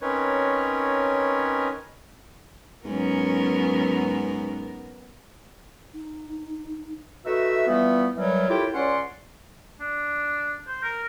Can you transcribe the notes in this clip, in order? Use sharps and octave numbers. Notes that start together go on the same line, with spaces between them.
C4 C#4 D#4 A#4 B4 C#5
G#2 F#3 B3 C#4 A#4
D#4
A3 D#4 F#4 B4 E5
E3 F3 G3 A3 B3
D#3 E3 F#3 G3
D#2 A2 E4 F4 G4 G5
C#2 C#4 D5 F#5 C6
D4
C5
A#4